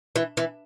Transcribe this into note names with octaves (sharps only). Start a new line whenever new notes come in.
E3
E3